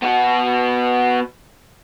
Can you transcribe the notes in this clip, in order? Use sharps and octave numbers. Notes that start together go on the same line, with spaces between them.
B3 F#4